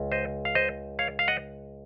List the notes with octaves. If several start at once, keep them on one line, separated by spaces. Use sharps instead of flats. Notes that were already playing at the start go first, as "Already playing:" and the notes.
Already playing: C#2
C5 D#5
F5
C5 D#5
C#5 F5
F5
D#5 F#5